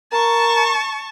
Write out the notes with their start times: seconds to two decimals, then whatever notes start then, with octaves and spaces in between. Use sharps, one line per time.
0.12 A#4 A5 C#6